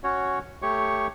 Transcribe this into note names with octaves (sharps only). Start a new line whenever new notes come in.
C#4 F#4 C#5
A3 G4 C#5 C#6